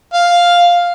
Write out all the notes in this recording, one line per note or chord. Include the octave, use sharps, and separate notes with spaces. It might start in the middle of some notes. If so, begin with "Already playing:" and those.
F5